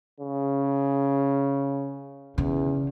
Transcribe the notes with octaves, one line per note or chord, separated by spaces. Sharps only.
C#3
E2 C#3